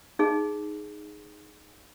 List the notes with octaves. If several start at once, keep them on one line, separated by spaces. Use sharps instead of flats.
D#4 G#4